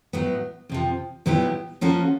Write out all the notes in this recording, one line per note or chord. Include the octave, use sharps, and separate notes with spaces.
A2 F#3 B3
F2 C3 F3
A#2 F#3 B3 E4 G4
F3 A#3 C#4 F#4 A4